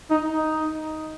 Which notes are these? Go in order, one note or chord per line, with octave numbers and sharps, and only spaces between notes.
D#4
D#4